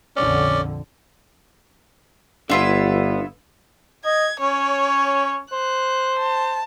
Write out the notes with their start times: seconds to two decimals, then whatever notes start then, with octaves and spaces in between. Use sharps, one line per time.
0.16 A#1 F2 D3 C#4 D5
2.50 G1 D3 B3 E4 F4 E5
4.05 D#5 G#6
4.41 C#4 C#5
5.52 C5 F#6
6.19 A5